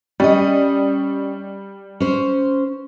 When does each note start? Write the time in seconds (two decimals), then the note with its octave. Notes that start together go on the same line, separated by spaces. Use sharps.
0.20 G3 C#4 D#5
2.00 C#4 C5